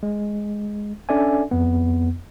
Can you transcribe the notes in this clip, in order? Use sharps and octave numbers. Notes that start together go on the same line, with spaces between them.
G#3
C#4 D4 A4 D5 E5 G#5
F2 B3